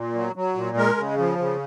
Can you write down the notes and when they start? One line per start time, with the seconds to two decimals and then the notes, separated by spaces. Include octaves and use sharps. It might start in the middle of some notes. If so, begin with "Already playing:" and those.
Already playing: A#2
0.15 F#3
0.36 F#3
0.55 A#2
0.77 G#3 A#4
0.97 C#3
1.18 F3
1.39 C#3